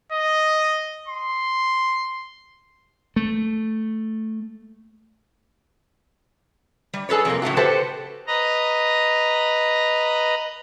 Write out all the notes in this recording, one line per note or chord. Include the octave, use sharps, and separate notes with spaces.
D#5
C6
A3
G3
G#4 A4 B4 C#5
F2 C3 A#3
A2 C#3 A3 F#4
F#4 G4 A4 B4 C5
B4 D#5 A#5